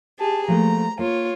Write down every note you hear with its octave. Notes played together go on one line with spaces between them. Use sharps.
G4 G#4 A5
F3 A3 A#3 A#5
A#3 F4 C#5